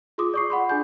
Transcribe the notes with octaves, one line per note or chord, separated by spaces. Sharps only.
F4 G#4 C6 D6 D#6
D5 C#6 C7
F#5 B5 C6
D4 G#4 G#5 G6